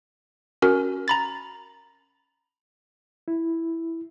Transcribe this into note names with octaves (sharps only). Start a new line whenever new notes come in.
C#4 F#4 A#4
A#5 B5 A6
E4